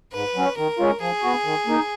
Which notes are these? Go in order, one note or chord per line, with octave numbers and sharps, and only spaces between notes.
G#2 B4
F#3 C#4
D#3 A#4
G#3 C#4 F4
F3 G#4
B3 F#4
D#3
A#3 D#4